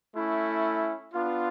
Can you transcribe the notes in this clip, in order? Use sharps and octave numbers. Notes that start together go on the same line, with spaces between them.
A3 C#4 E4
B3 D4 F4